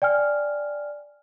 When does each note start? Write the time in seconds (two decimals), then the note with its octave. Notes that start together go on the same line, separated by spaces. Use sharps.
0.02 D5 G5 G#5 F6